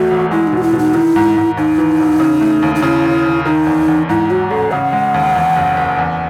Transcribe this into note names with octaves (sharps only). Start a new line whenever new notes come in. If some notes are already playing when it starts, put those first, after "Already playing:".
Already playing: G#1 E2 A3 F#4
E1
G#3 E4
D#4
B2 F#4
E4
B2
D#4
D#3 E4
G#2
G#2
D#2 D#4
E3
E1
C#3
A3
D#2
D#4
C#3 E4
D#2
D#2
D#3 D#4
E2
E2
G#2 E4
F#3 F#4
A1 A4
C#3 F#5
G#3
D#2
E2
F#1
F#1
E2